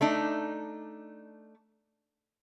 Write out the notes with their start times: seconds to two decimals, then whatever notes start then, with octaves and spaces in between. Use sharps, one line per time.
0.01 A3 D4 D#4